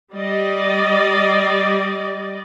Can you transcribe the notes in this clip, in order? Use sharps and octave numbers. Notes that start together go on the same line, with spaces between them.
G3 D5 D#5